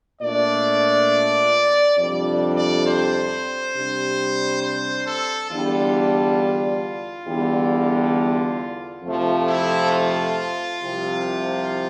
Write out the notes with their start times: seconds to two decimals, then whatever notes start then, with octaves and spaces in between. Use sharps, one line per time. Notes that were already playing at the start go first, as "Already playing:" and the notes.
0.21 A#2 A3 D4 D5
1.98 F2 C3 G3 D4 D5
2.57 D5
2.87 C5
3.75 C3 G3 D4
4.62 C5
5.07 A4
5.51 E2 D3 G3 D4 F4
7.27 E2 D3 G3
9.03 F2 C3 F3 A3
9.47 E4
9.92 F4
10.81 C2 C3 F3